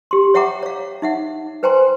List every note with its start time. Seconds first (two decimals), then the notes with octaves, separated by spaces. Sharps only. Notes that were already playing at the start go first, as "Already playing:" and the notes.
0.11 G4 C6
0.34 C#5 E5 F#5 G5 A#5 D6
0.63 C#5 F5
1.02 D#4 E5 F#5
1.63 B4 C5 G5 G#5 A#5 C6